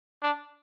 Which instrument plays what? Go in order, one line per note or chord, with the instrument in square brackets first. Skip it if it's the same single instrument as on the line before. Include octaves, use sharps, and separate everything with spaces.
[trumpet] D4